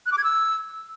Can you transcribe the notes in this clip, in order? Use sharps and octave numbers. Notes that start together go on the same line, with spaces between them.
F#6
D6
G#6
E6